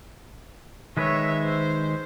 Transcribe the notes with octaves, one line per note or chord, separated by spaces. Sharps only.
D#3 G#3 B4 C#5 E5
C5